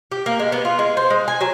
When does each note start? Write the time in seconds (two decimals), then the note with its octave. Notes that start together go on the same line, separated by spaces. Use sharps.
0.12 G4
0.26 A#3
0.39 G#3
0.52 B3
0.65 F4
0.79 G#3
0.97 C5
1.10 G#3
1.28 G#5
1.41 F#3